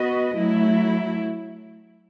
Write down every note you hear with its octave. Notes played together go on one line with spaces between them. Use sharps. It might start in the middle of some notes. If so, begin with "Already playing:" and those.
Already playing: B3 F#4 B4 D#5
F#3 A3 E4